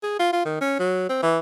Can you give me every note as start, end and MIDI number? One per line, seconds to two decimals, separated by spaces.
0.03 0.17 68
0.19 0.30 65
0.33 0.44 65
0.45 0.61 51
0.61 0.75 61
0.79 1.05 54
1.09 1.18 60
1.23 1.39 52